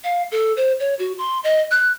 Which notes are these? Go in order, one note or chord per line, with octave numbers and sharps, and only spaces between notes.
F5
A4
C5
C#5
F#4
C6
D#5
F#6